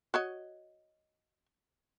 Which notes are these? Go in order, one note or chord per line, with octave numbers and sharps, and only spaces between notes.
F#4 C#5 D#5